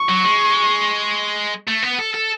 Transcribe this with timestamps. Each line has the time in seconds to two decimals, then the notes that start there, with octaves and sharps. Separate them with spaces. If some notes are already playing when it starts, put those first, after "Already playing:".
Already playing: C#6
0.09 F#3
0.23 G#3
1.67 A3
1.83 B3
1.99 A4
2.14 A4